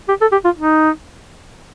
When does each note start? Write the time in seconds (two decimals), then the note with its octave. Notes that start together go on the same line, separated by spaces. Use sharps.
0.08 G4
0.21 A4
0.32 G4
0.45 F4
0.57 D#4